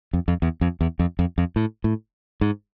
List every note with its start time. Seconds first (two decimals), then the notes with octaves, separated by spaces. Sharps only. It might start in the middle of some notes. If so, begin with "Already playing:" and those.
0.13 F2
0.28 F2
0.42 E2
0.61 F2
0.81 E2
0.99 F2
1.19 F2
1.38 F2
1.56 A2
1.84 A2
2.41 G#2